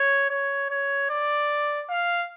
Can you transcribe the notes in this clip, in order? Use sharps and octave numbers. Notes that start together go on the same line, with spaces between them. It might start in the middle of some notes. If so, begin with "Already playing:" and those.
Already playing: C#5
C#5
C#5
D5
F5